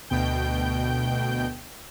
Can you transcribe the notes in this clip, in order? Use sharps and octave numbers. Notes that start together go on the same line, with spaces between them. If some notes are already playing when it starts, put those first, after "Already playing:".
D2 B2 G5 G6